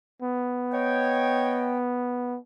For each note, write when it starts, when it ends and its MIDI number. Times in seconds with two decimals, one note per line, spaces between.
0.22 2.38 59
0.72 1.78 73
0.72 1.78 75
0.72 1.78 79